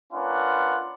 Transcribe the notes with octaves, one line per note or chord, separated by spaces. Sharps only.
A#3 C#4 D4 F4 B4 F#5